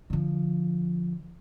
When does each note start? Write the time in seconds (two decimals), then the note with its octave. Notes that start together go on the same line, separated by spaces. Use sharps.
0.10 D3 F3